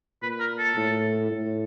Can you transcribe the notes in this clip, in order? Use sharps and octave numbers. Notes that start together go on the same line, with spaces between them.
A#2 B4
A#4
A4
A2
A2